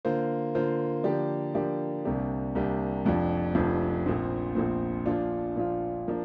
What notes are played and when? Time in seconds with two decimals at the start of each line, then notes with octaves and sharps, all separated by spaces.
0.05 D3 A#3 F4 C5
0.55 D3 A#3 F4 C5
1.04 D3 F3 A#3 G4 D5
1.54 D3 F3 A#3 G4 D5
2.05 C2 C3 A#3 D4 G4
2.55 C2 C3 A#3 D4 G4
3.05 F1 F2 F3 D4
3.55 F1 F2 F3 D4
4.06 A#1 A#2 F3 C4
4.55 A#1 A#2 F3 C4
5.06 A#2 F3 D4 F4
5.56 A#2 F3 D4 F4
6.08 F3 A#3 D4